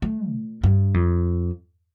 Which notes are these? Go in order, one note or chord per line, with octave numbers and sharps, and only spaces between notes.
A3
A#2
G2
F2